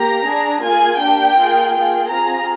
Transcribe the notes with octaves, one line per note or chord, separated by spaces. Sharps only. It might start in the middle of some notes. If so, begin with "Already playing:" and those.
Already playing: A#3 G4 A#5
D4 G#4
A#3 F4 G#4 G#5
A#3 D4 G4 G5
A#3 F4 G#4
A#3 F4 G#4 G5
C4 F4 G#4 A#5